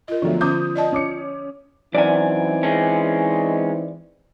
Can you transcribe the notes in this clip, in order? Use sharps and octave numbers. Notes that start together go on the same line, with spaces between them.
F4 A#4 D#5
D3 F3 F#3 A3 B3
D3 C#4 D6 D#6 G6
D5 D#5 A5
C#4 D6 C#7
F#2 E3 C4 D#4 D5 G#5
G#3 C#4